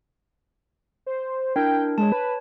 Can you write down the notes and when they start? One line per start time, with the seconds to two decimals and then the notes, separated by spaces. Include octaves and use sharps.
1.06 C5
1.56 D4 E4 A#4 G5
1.98 G#3 C#5 A5
2.12 B4